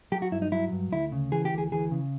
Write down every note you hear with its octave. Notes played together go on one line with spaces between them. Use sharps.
F#3 G4
F#4
G2 E4
D#4
F#3 E4
G2
D2 E4
C#3
E3 G#4
G4
D2
G#4
E3 G#4
C#3